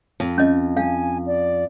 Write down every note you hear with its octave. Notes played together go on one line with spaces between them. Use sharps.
F2
C#4 D#5
F5 G#5
D5